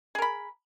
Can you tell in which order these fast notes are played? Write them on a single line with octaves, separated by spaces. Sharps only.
G#4 A#4 B5